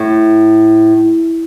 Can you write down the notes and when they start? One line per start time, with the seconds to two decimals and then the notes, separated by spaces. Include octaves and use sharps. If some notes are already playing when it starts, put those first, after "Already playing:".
Already playing: A2